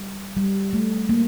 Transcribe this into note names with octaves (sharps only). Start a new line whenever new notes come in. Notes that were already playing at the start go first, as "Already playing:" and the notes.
Already playing: G3
G3
A3
A#3